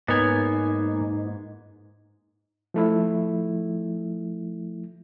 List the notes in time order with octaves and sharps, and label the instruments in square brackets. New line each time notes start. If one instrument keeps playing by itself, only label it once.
[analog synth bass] G#2 [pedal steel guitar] A#3 G#5 [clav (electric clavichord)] B3 C#5 [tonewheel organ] D#4
[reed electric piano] F3 A3 E4